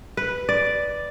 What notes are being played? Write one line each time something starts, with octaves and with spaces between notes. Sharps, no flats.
B4
D5